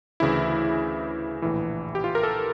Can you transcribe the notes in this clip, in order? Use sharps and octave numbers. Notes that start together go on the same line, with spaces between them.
D2 C#3 E3 E4
A#1 A2 E3
G4
F4
A#4
A4